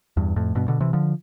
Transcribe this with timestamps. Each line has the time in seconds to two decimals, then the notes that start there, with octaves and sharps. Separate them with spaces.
0.17 E2 G2
0.36 F2 A2
0.55 G2 B2
0.68 B2 D3
0.80 C3 E3
0.93 D3 F3